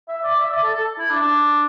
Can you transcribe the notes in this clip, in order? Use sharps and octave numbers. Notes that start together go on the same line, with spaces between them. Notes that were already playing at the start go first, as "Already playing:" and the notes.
E5
D5
E5
D5
A4
A4
E4
D4
D4